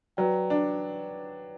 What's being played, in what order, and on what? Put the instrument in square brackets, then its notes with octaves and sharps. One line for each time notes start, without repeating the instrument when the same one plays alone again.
[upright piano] F#3 [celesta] B4 D5 G5
[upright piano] D4